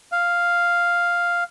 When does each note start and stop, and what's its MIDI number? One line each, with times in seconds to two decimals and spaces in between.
0.12 1.44 77